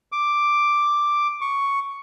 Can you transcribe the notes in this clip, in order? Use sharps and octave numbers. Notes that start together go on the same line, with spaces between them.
D6
C#6